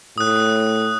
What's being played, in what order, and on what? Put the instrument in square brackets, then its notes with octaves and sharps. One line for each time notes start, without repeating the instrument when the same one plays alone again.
[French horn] A2 [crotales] D#6 F#6